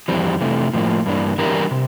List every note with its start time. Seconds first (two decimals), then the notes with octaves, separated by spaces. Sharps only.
0.08 F2 E3 G3 C4
0.41 C3 E3 A3
0.73 A2 F3 A#3
1.06 G2 E3 A#3 D4
1.38 E3 G3 D4 G4 A#4
1.71 C3